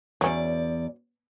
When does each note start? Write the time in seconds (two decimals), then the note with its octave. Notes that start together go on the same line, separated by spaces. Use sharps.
0.21 E2 F#3 C#4 D5